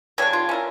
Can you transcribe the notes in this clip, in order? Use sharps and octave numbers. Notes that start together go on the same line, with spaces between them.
C#3 G3 D4 C#5
F4
C#4 E4 A#4